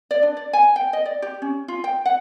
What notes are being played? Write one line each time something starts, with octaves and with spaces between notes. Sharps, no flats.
D5
D4
D5
G#5
G5
D#5
D5
G4
C#4
F4
G5
F#5